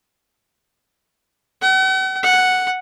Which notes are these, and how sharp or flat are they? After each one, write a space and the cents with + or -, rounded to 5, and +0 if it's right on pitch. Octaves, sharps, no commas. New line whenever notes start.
F#5 +45
F#5 +0